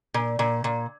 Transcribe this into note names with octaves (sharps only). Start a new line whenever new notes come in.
A#2
A#2
A#2